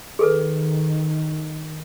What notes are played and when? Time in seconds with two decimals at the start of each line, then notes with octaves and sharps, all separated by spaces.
0.19 D#3 G#4 A4 B4